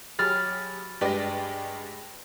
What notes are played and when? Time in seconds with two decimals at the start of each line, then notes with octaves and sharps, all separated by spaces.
0.19 F#3 G4 G#4 B5 F6 A6
1.01 G2 G#3 G4 B4 D5 A#6